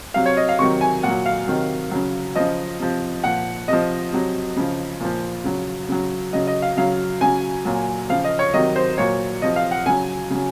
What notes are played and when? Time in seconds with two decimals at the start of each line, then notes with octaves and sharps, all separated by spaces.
0.14 C3 F#3 F5
0.26 C#5
0.37 D#5
0.49 F5
0.59 C3 D#3 F#3 C#6
0.81 G#5
1.03 A#2 F#3 F#5
1.26 F5
1.47 C3 D#3 F#3
1.91 C#3 F#3
2.35 C#3 F3 D#5
2.79 C3 F3
3.24 A#2 F3 F#5
3.68 C3 F3 D#5
4.12 C3 F#3
4.56 C#3 F3
5.00 A#2 F3
5.44 C#3 F#3
5.89 C#3 F#3
6.33 C#3 F#3 D#5
6.47 D#5
6.62 F5
6.77 C#3 F#3 F5
7.21 C#3 F#3 G#5
7.65 A#2 F#3
8.10 C#3 F3 F5
8.24 D#5
8.39 C#5
8.54 C3 D#3 F#3 D#5
8.76 C5
8.98 A#2 F#3 C#5
9.42 C3 F3 D#5
9.56 F5
9.71 F#5
9.86 C#3 F#3 G#5
10.30 C#3 F#3